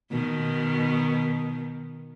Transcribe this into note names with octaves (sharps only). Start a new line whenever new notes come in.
B2 D#3